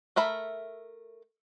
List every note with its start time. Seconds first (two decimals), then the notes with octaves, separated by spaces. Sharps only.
0.16 A3 A#4 E5 B5